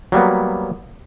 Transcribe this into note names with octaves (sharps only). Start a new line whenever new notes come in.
F#3 G3 A#3 B3